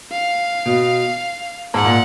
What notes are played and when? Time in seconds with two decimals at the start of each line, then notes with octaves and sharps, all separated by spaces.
0.12 F5
0.66 B2
1.74 G#2 F#5
1.84 A#2